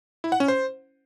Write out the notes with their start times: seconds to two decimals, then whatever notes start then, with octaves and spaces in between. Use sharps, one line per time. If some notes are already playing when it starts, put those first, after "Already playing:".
0.24 E4
0.32 F#5
0.40 C#4
0.48 C5